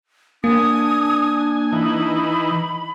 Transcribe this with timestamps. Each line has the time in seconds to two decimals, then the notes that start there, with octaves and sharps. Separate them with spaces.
0.44 A#3 D4 G#5 D#6
1.73 E3 D#4 B5